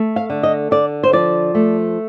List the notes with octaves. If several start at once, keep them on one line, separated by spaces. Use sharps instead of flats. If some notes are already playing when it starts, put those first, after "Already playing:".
Already playing: A3
F5
D3
D#5
D3 D5
C5
F3 D5
A3